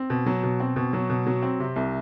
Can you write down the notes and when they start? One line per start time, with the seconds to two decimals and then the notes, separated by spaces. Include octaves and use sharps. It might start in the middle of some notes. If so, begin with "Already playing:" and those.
Already playing: C4
0.10 B2
0.26 F#3
0.43 B2
0.60 C4
0.76 B2
0.93 F#3
1.10 B2
1.26 F#3
1.43 C4
1.60 C3
1.76 C2